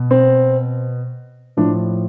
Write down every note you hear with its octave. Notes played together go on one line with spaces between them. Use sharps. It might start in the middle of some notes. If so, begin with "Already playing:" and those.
Already playing: B2
C4
A2 F3 D4